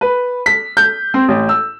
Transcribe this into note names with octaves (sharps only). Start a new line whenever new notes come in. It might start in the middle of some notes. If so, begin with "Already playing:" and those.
B4
B6
G6
C4
A1
E6